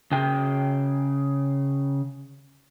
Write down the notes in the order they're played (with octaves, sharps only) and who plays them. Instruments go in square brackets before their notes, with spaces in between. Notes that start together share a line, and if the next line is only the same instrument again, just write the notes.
[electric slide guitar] C#3 G5